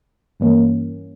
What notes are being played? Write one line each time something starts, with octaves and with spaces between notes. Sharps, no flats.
G2 E3 A#3 C#4